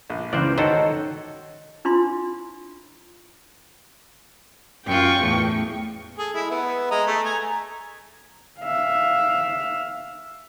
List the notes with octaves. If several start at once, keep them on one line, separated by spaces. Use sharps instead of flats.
A#1
C#2 C#3 E3 A#4 C5 D5
D#3 F#4 A4 C5 C#5
D4 E4 F4 C6
F#2 F4 G5 C#6
E2 A2
G#4 A4
G#3 E4
B3 E5
G#3 D#5 A#5
A3
G#5 A#5
E5 F5